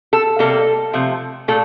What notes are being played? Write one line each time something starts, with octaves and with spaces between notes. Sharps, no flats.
A4
C3 G3 A#3 A4
C3 F3 A3
A#2 A3 A4